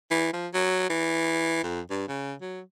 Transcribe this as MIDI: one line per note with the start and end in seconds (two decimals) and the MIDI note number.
0.10 0.33 52
0.33 0.47 53
0.53 0.89 54
0.89 1.62 52
1.63 1.80 41
1.90 2.06 43
2.08 2.33 49
2.41 2.60 54